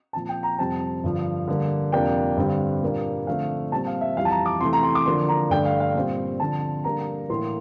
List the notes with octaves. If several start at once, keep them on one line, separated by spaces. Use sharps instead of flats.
A#2 F3 C4 A5
G5
A#5
F2 C3 G3 C4 A5
G2 D3 F3
D3 G3 A#3
F2 C3 G3 A#3 D4 G5
G2 D3 G3 C4
A#2 G3 A#3 D4
D3 F3 A3 C4 F5
A#2 G3 C4 A5
F5
E5
F2 E3 G3 F5
A5
A#5
D6
C3 E3 A3 C6
A#5
C6
D6
D3 F3 A#3 D4 C6
A#5
G2 D3 A3 D4 G5
F5
F5
A#2 G3 C4
D3 F3 C4 A5
D3 G3 A#3 D4 A#5
A2 E3 A#3 C6